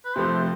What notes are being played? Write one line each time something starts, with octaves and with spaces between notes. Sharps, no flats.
B4
C3 F3 A3 C5